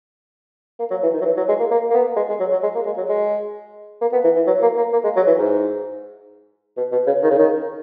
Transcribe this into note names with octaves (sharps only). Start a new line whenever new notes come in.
A#3
F#3
E3
D#3
F#3
E3
F#3
G#3
A#3
A#3
A#3
B3
G#3
G#3
F#3
F#3
G#3
A#3
G#3
F#3
G#3
A#3
B3
E3
E3
F#3
A#3
A#3
A#3
G#3
F#3
E3
G#2
B2
B2
C#3
D#3
C#3
D#3